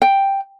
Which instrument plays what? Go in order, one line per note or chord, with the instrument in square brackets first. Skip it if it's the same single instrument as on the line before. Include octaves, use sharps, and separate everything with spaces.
[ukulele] G5